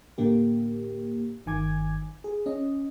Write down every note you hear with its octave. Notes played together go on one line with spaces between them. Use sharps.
A2 D3 A#3 G4
G1 D#3 G#5 D6 G#6
G#4
C#4 D#5